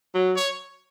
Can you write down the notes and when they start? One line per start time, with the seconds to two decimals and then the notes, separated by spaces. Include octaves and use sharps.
0.14 F#3
0.36 C#5